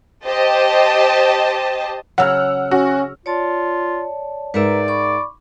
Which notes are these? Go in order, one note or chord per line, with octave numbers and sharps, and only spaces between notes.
G4 C5 D#5 A5
C#3 F#3 F#5 E6 F6
C#4 F#4
F4 C#5 D5 A5
G#2 A#4 B4 D5 E5 A#5
B5 C#6 D6